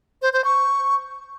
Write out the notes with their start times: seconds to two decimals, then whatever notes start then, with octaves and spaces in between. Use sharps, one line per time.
0.22 C5
0.33 C5
0.45 C#6